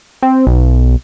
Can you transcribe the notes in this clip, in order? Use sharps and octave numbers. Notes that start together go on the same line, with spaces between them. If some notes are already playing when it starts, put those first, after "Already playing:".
C4
B1